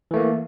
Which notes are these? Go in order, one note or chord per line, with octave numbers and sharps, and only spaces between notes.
E3 A3 A#3